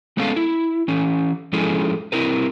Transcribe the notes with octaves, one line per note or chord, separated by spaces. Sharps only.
G#3 B3 C#4 A4 F5
E4
E3 C#4
F3 G#3 C#4 E4 G#4 A4
C4 E4 A#4 B4